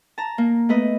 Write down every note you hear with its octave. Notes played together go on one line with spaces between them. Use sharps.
A5 A#5
A#3
A3 B3 B4 D#5